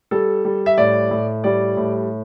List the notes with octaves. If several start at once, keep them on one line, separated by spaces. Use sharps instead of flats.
G3 A4
G3
E5
A2 D5
A2
G3 D5
A2